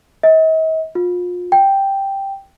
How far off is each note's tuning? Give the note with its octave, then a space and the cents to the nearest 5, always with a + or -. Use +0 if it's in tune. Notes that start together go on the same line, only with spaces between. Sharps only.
D#5 +45
F4 +30
G5 +0